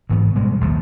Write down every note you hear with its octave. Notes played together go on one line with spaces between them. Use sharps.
D2 G#2 E3 B3
B2 G3 G#3
A#1 D#2 F3